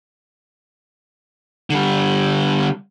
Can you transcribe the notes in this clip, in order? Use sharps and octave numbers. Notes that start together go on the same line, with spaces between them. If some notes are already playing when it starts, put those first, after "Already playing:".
D3 G3